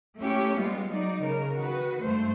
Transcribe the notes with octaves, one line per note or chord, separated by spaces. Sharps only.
A3 C#4 E4 G4
G3 G#3 B3 F4
F#3 D#4 D5
C#3 A#4
D#3 F#4 B4
G2 A3 C5